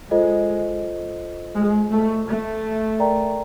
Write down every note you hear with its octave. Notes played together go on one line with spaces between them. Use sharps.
G#3 F4 A4 C5 D#5
G#3
A3
A3
A#4 D5 G5 A#5